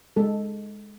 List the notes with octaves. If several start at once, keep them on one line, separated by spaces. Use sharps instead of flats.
G#3 A4